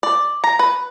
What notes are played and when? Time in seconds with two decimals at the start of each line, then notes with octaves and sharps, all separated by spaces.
0.03 D5
0.44 A#5
0.59 B4